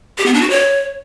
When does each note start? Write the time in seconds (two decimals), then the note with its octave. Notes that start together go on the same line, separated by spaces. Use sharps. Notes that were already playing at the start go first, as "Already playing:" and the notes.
0.18 G4
0.26 B3
0.34 D4
0.42 F#4
0.50 C#5